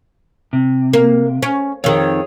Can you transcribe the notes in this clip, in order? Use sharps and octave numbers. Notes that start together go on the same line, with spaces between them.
C3
A#3
C#4
F2 D#3 G#4 C#5